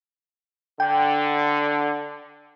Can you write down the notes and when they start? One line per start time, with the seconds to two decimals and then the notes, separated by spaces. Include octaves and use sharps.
0.80 D3 G5